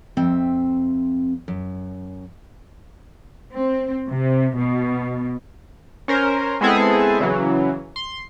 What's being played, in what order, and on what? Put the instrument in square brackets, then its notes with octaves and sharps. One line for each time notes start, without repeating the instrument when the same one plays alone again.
[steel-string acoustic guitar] F2 C4 E5
F#2
[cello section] C4
C3
B2
[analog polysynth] C#4 A#4 C5
G#3 B3 C4 E4 G#4 A4
C#3 E3 F#3
C6